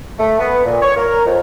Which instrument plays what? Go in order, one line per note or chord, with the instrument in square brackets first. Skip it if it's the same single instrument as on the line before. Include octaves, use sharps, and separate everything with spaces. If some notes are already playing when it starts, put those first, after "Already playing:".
[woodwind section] A3
B3
A#2
C#5
A#4
F2